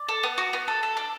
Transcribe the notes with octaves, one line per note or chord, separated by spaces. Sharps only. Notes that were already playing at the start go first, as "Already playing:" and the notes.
Already playing: D5
A4
B3
F#4
B3
A4
A4
D4